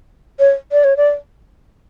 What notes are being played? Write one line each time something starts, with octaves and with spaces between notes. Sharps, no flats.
C#5
D5
C#5
D5